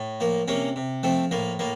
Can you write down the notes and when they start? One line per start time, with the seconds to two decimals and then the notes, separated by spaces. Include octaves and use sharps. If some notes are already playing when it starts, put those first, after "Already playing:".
Already playing: A2
0.20 F3 A#3
0.48 C3 A#3 C#4
0.76 C3
1.03 F3 A3 C4
1.31 A2 A#3
1.59 A2 A#3